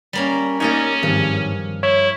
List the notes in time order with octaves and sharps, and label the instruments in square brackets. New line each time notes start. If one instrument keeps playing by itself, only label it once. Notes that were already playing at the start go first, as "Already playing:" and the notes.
[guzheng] G3 A#3 C#4
[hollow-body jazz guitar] A#3 D#4 [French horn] C#4 [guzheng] D5 D#5 G#5
[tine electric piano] G#1 [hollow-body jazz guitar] G2 [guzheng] F3
[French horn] E4 [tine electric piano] C#5